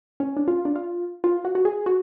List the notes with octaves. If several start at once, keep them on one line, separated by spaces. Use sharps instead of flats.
C#4
D4
F4
D4
F4
F4
F#4
F#4
G#4
F#4